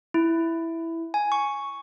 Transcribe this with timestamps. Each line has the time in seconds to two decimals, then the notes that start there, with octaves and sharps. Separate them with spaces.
0.14 E4
1.14 G#5
1.32 C#6